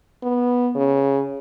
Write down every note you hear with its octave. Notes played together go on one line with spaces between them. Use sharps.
B3
C#3